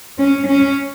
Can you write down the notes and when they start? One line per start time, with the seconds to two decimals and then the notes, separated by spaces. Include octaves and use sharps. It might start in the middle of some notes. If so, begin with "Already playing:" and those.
0.19 C#4
0.47 C#4